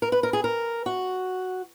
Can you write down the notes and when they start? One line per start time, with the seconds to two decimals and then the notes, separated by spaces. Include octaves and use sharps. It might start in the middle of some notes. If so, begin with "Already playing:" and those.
0.02 A#4
0.12 B4
0.23 A#4
0.33 G#4
0.44 A#4
0.86 F#4